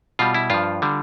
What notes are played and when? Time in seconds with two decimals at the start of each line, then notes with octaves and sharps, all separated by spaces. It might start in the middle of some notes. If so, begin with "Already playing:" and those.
0.19 B2 G3 F4
0.34 E4
0.50 G2 F3 F4
0.82 D3 G3